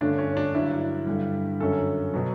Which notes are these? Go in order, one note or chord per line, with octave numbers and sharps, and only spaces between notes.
G2 D3 A3 C#4 D4
C#4
D4
G2 D3 F#3 E4
G2 D3 G3
F#2 D3 F#3 C#4 A4
B2 F#3